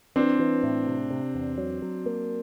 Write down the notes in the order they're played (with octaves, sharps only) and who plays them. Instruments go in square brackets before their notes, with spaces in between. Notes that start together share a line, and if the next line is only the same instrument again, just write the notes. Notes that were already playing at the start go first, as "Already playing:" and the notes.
[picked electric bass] E3 [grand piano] C4 D4
[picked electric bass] E3
A2
C3
C3
E2
F#3
F#3
A#3